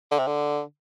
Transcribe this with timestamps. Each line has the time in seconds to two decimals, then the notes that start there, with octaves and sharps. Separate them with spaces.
0.11 D3
0.19 C3
0.27 D3